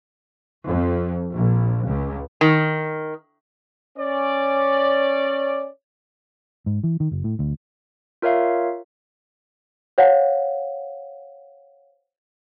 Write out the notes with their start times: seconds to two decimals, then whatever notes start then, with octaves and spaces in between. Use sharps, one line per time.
0.67 F2
1.35 A#1
1.87 C#2
2.41 D#3
3.98 C#4 C#5 D5
6.66 G#2
6.84 E3
7.00 D#3
7.11 F#1
7.24 A2
7.39 D2
8.22 F4 A#4 C#5 E5 F5
9.98 C5 C#5 F5 F#5